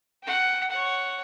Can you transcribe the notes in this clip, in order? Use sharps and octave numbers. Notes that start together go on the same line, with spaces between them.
F#5 G5
C#5 F#5